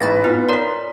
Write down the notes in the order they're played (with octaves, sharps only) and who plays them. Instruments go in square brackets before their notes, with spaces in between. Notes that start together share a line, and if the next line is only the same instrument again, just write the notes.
[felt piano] A1 G#2 [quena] B4 [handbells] B5 A6 A#6
[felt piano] B3 F4 [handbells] D#4
[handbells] A#4 C#5 D5 [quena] A#5 [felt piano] C6 B6